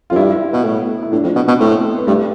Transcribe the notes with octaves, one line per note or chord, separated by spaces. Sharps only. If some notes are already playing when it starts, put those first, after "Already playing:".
F2 F4
G2 E4
B2
A2
E4
A2 D4
F2
B2
B2
A2 C4
B3
G2 A3